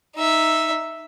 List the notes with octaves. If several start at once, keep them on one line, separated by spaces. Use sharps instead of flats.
D#4 E5